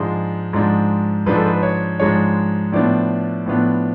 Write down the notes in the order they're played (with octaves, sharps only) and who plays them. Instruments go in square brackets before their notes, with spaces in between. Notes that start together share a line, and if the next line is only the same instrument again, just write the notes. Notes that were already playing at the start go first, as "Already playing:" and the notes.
Already playing: [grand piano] G#2 F3 G#3 D4
G#2 F3 G#3 D4
G#2 F3 G#3 D4 B4
A4
B4
C#5
G#2 F3 G#3 D4 C#5
A2 F3 B3 D4 D5
A2 F3 B3 D4